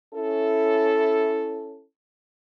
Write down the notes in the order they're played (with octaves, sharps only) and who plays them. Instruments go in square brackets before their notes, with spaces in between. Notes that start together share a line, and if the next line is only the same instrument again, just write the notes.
[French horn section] C#4 E4 A4